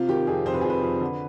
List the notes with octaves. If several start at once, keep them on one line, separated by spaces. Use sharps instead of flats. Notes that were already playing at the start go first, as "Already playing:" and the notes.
Already playing: C3 F4
D#3 G4
F2 G#4
F2 C5
B4
G#4
F2
B4
F2
D3